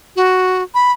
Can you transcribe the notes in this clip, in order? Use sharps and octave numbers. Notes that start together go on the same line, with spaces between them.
F#4
B5